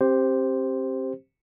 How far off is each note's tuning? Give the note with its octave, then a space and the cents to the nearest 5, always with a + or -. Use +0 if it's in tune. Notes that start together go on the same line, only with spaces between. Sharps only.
C4 +30 G4 +0 C5 +0